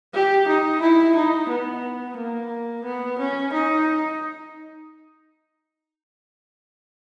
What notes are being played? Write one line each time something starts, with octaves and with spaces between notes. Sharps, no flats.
G4
D#4
E4
D#4
B3
A#3
B3
C#4
D#4